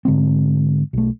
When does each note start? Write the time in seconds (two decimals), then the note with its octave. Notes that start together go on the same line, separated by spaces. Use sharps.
0.05 G#2 D3 G#3 C4
0.93 B1 A3